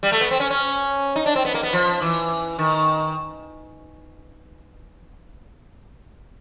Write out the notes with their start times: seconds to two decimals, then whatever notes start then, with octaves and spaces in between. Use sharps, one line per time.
0.03 G3
0.12 A3
0.21 B3
0.31 C4
0.40 C#4
0.51 C#4
1.16 D#4
1.26 D4
1.35 C4
1.45 B3
1.54 A#3
1.63 B3
1.73 F3
2.01 E3
2.59 D#3